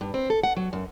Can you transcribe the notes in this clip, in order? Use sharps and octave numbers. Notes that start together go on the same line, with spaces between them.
G2
C4
A4
F#5
F#3
F#2